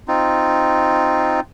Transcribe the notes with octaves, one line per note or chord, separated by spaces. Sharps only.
C4 D#4 F4